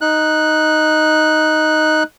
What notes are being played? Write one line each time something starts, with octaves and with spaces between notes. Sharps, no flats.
D#4 F#6